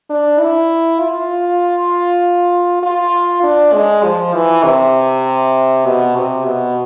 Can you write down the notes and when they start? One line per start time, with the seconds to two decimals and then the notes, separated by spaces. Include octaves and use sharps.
0.10 D4
0.40 E4
1.00 F4
2.83 F4
3.43 D4
3.74 G#3
4.04 F3
4.34 E3
4.64 C3
5.86 B2
6.16 C3
6.46 B2